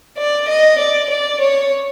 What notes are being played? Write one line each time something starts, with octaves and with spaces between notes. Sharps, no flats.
D5
D#5
D5
D5
C#5